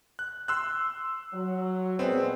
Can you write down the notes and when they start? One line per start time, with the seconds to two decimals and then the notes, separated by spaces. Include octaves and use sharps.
0.19 F#6
0.48 C6 E6 F#6
1.33 F#3
1.99 A#2 G#3 B3 C4